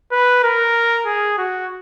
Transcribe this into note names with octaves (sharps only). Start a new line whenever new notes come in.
B4
A#4
G#4
F#4